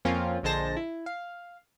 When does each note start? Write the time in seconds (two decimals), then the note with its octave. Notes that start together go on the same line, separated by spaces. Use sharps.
0.05 F2 F3 A#3 C4 C#4 F4
0.43 A#1 D3 G#3 C5 A5 A#6
0.77 E4
1.06 F5